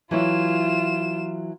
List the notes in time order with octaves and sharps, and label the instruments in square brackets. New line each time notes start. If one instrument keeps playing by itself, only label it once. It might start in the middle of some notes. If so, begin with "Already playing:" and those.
[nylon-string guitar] E3 F#3 E4 [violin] F4 E7